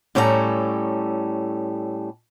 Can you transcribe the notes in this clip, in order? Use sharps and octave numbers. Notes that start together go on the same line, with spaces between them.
A2 G3 C#4 A4 G5 A#5